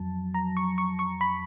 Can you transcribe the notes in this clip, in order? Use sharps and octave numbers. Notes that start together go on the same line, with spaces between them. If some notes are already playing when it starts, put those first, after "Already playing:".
Already playing: F2 F#3 A5
A#5
C#6
C#6
C#6
B5